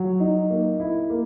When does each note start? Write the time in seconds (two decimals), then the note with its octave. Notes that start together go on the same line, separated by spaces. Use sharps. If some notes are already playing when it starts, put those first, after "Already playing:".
Already playing: F#3
0.20 D#4
0.50 A#3
0.80 E4
1.10 A#3